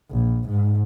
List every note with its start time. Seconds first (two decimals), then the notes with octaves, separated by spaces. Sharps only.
0.11 A#1
0.49 G#2